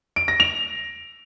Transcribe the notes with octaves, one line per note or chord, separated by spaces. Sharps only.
D7
A#6
F7